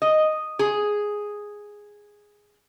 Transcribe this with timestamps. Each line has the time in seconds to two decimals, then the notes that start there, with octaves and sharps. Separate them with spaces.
0.02 D#5
0.59 G#4